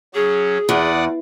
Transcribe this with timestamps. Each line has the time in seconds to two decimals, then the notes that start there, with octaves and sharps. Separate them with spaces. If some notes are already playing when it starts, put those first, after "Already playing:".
0.15 F#3 C#4 G#4
0.69 E2 D5 F#5 D#6